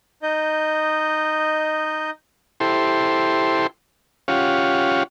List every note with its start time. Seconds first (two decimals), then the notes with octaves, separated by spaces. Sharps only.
0.23 D#4 D#5 G6
2.60 E4 G4 A4 C5 C6
4.28 C#4 F4 G4 C#5 F5 F#5